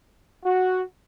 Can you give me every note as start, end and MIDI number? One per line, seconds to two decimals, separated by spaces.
0.44 0.81 66